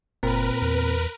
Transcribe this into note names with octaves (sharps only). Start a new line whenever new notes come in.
F#1 A#2 C4 A#4 B4
E2